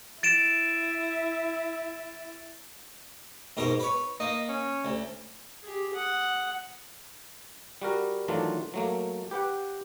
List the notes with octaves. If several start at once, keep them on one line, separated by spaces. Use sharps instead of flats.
E4 A6 D7 E7
G#2 B2 A#4
B4 C#5
A#3 D#5
C#4
D2
G4 G#4
F#5 D#6
G3 F#4 A#4
D#3 E3 F#3 A3 D4 F4
F#3 A3 A#3
G4 B4 F#5 G5